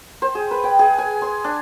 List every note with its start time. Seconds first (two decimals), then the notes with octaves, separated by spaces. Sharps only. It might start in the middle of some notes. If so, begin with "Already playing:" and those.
0.22 C5
0.35 G#4
0.51 B4
0.64 G5
0.79 G#4
0.98 G#5
1.22 C6
1.44 D4